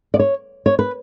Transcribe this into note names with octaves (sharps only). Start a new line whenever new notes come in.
D5
C#5
C#5
B4